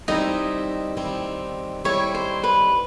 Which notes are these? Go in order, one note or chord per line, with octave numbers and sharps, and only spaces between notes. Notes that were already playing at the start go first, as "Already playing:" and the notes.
D#3 G3 C4 D#4 E4 D#5
D#3 G3 C4 E4
D#3 G3 C4 E4 C#5
C5
B4